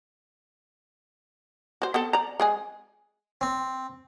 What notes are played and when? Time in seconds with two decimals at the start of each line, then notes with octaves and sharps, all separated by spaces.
1.82 F#4 C5
1.94 B3 C4 A4
2.13 D5 A#5
2.40 G#3 G#4 G#5
3.41 C4